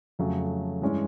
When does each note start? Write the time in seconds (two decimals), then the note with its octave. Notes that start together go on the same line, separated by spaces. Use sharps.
0.19 F2 C#3 F#3 A3
0.82 G2 E3 G#3 C#4